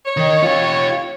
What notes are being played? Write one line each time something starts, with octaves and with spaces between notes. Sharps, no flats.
C#5
D#3 D#4
F4 G4